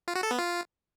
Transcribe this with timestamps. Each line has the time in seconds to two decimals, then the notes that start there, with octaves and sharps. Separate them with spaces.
0.08 F4
0.15 F#4
0.23 A4
0.31 B3
0.38 F4